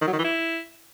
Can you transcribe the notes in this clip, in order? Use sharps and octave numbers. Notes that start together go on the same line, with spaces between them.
D#3
F#3
D#3
E3
E4